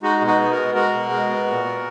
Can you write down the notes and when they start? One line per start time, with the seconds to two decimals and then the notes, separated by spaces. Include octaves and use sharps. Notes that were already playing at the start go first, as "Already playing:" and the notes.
0.03 G#3 D#4 F#4
0.21 B2
0.27 D#4 F#4
0.39 B3
0.51 F#4 A#4
0.57 G#3
0.75 G#3 F#4 A#4
0.93 B2
1.10 G#3
1.29 B3
1.47 A#2
1.65 B3